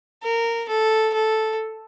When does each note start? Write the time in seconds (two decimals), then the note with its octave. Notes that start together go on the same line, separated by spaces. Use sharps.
0.23 A#4
0.69 A4
1.14 A4